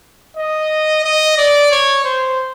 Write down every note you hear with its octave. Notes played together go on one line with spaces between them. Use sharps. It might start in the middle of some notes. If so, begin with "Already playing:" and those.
D#5
D#5
D5
C#5
C5